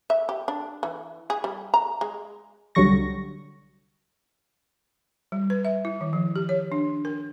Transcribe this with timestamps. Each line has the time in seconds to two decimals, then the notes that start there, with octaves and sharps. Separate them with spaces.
0.10 E5
0.29 G4
0.48 D4
0.83 E3
1.30 G#4
1.44 G3
1.74 A#5
2.01 G#3
2.75 C2 D3 F#3 G3 C#6 A#6
5.32 G3
5.50 B4
5.65 E5
5.85 E4
6.01 D#3
6.13 F3
6.36 G4
6.49 C#5
6.72 D4
7.05 A#4